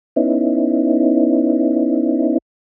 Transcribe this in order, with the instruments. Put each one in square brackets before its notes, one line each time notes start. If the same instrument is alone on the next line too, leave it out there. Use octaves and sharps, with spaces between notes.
[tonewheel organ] B3 C#4 D#4 E4